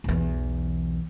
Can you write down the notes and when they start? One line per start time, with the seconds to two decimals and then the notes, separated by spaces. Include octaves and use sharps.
0.04 B1 E2